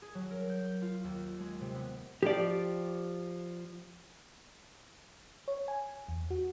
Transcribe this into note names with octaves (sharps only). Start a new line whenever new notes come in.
G#4
F#3
A#4
G6
F4
D#2
G#3
C3
B3
F3 G4 D5
C#5
G#5
E2
F#4